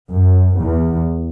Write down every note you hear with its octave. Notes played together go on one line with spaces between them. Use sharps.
F#2
E2